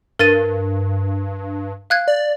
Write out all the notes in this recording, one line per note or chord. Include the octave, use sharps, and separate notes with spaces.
G2 A#4 A6 D#7
F5 F#6 G#6
D5